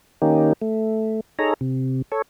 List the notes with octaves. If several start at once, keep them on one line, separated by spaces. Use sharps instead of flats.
D#3 A#3 C#4 D#4 G4
A3
D#4 G#4 A4 C#5 A#5
C3
A4 C#5